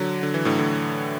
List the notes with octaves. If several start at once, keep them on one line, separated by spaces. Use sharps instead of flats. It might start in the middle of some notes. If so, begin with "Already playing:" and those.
Already playing: D3 F#3
D3
E3
A2 D3
A2 D3